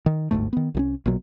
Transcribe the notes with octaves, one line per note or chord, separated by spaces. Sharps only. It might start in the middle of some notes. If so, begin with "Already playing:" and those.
D#3
G1 D2 G#2 A3
D#3 B3
C2 E3 C#4
A#1 B2 F#3